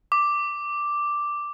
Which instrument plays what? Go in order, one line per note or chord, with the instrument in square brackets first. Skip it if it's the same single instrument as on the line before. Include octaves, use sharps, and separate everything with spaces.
[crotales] D6